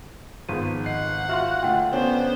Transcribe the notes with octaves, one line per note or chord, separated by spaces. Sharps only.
G#1 F3 B3 G#4 D#7
D#5 F#5 C7
F4 F#4 E5 F5 C6 F6
D3 A3 F4 F#5 G5
C#3 B3 C#4 D4 C5